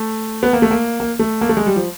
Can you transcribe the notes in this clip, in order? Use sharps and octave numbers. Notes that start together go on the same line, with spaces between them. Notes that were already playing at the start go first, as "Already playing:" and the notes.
Already playing: A3
B3
A#3
A3
A#3
A#3
A3
A#3
A3
G#3
G3
F3